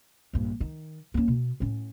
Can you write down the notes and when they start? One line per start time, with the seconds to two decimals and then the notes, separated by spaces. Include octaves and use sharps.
0.33 A#1 G2
0.60 D#3
1.14 A#3 C#4
1.28 B2
1.60 A2 C#4